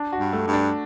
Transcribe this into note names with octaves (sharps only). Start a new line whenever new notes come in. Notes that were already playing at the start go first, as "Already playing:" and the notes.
Already playing: D4
F#4
G2
A3
G2
D4